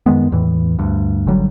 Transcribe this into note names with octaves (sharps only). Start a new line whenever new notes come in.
F#2 D#3 G#3 B3
E2 A2 E3
D2 G2
G#1 D3 F#3 G3